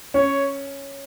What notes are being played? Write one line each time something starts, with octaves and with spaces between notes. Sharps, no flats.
C#4 C#5